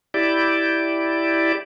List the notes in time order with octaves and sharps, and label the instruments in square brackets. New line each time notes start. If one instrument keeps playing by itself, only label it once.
[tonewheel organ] E4 G4 D5